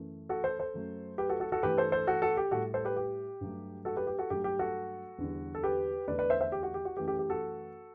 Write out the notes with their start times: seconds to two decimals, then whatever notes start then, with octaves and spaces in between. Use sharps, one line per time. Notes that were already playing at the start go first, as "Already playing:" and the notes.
Already playing: F#2 E3 A3
0.29 F#4 A4
0.44 A4 C5
0.59 A4 C5
0.74 F#2 F#3 A3
1.18 G4 B4
1.29 F#4 A4
1.40 F#4 A4
1.52 F#4 A4
1.63 G2 E3 A3 G4 B4
1.77 A4 C5
1.92 A4 C5
2.07 F#4 A4
2.22 F#4 A4
2.37 G4
2.51 A2 G3 F#4 A4
2.74 A4 C5
2.85 G4 B4
2.96 G4
3.41 G2 F#3 A3
3.85 F#4 A4
3.96 G4 B4
4.07 G4
4.18 F#4 A4
4.30 G2 F#3 A3 G4
4.44 G4
4.59 F#4 A4
5.18 E2 D3 G3
5.55 A4
5.63 G4 B4
6.07 E2 D3 A3 B4 D5
6.19 B4 D5
6.30 C5 E5
6.41 C5 E5
6.52 G4
6.63 F#4
6.74 G4
6.85 F#4
6.97 F#2 E3 A3 G4
7.08 G4
7.19 G4
7.30 F#4 A4